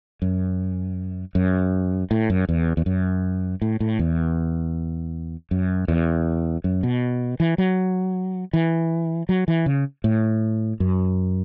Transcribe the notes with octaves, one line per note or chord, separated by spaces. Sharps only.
F#2
F#2
A2
F#2
E2
E2
F#2
A2
A2
E2
F#2
E2
F#2
B2
E3
F#3
E3
F#3
E3
C#3
A2
F#2